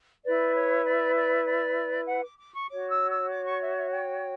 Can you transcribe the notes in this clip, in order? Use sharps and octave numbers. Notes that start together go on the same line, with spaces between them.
E4 B4 D5
C#5
D5
D5
D5
F#5
D6
D6
C#6
F#4 C#5 D6
E6
E6
D6
C#6
E5
E5
G5